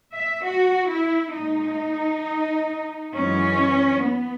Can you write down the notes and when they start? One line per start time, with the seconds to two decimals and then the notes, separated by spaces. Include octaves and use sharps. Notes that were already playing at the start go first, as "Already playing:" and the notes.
0.14 E5
0.44 F#4
0.89 E4
1.34 A#2 G#3 D#4
3.14 F#2 E3 G#3 C#4
4.05 B3